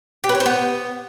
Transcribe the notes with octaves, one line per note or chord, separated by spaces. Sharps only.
G4
B4
C#5
C5
B3